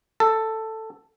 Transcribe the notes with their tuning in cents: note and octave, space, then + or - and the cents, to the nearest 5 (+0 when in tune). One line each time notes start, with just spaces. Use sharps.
A4 +10